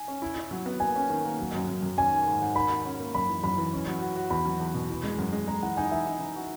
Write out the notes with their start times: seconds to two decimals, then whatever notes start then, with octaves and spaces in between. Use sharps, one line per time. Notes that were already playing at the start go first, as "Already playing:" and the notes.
Already playing: G#5
0.08 C#4
0.22 E4
0.36 E4
0.51 F#3
0.66 B3
0.80 A#3 G#5
0.96 C#4
1.10 D#3
1.25 A#3
1.39 F#3
1.54 F#2
1.68 F#2
1.83 F#2
1.98 C#4 G#5
2.11 D#3
2.27 G#2
2.42 G#2
2.55 D#3 B5
2.70 F#4
2.85 C#4
3.00 A#3
3.15 F#2 B5
3.29 E3
3.44 F#2 B5
3.58 E3
3.73 C#4
3.87 F#3
4.01 F#4
4.16 F#4
4.30 E2 B5
4.46 F#3
4.60 E2
4.74 B2
4.90 E3
5.04 G#3
5.18 F#2
5.33 G#3
5.47 G#3 A#5
5.63 E3 F#5
5.77 D#4 G#5
5.91 E3 E5
6.06 D#4
6.20 D#4
6.36 F#4